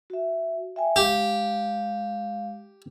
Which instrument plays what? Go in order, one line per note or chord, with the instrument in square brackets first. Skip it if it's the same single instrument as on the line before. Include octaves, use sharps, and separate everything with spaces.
[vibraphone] F#4 E5
E5 G5 G#5
[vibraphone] G#3 F5 [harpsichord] G4